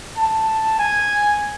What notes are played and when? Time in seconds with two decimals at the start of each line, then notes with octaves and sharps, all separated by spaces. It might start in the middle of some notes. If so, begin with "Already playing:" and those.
0.17 A5
0.79 G#5